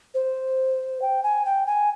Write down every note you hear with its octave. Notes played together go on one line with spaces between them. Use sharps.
C5
G5
G#5
G5
G#5